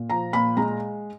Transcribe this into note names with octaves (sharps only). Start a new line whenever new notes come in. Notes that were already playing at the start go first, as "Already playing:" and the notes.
Already playing: A#2
F3 A#5
A#2 B5
G#3 A#5